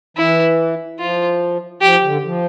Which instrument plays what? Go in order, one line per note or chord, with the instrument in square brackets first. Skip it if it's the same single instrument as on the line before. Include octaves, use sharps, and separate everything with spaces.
[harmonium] E3 [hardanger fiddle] E4
[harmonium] F3 [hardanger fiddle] F4
[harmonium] F3 [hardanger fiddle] G4
[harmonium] D3
F3